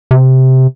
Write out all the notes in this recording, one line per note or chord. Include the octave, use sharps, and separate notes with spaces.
C3